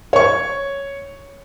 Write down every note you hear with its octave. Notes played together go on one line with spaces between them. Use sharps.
C#5 C#6